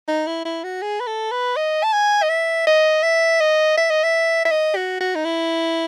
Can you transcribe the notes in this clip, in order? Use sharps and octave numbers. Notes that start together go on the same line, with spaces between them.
D#4
E4
E4
F#4
G#4
B4
A4
B4
D#5
A5
G#5
D#5
E5
D#5
E5
D#5
E5
D#5
E5
E5
D#5
F#4
F#4
D#4
E4